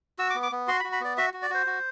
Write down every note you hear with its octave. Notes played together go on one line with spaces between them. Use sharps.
F#4 E6
D6
B3
D6
B3
F#4 C6
B5
F#4
B5
B3 D5
F#4 E5
F#4
D5
F#4 C5
F#4